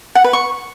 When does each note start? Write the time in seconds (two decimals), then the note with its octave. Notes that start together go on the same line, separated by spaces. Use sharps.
0.15 F#5
0.24 B4
0.33 C#6